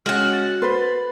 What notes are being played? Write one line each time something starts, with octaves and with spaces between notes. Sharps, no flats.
G#3 C#4 F#4 F#5 F6
A6
B4 C5 B5 C6